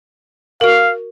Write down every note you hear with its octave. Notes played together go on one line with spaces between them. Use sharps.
F#4 A#4 F5